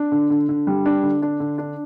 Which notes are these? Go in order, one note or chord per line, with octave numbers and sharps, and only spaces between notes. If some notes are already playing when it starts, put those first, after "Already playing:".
Already playing: D4
D3
D3
D3
G3
D4
D3
D4
D3
D4